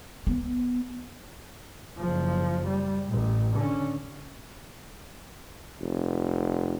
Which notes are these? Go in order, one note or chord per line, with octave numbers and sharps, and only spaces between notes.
B3
F#1 F3
G3
A1 A2
D3 C#4
F1